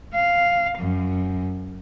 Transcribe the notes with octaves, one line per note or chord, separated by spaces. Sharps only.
F5
F#2